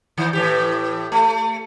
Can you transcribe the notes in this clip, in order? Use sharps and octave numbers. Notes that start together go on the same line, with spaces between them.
D#3
A2 E3 G4
A3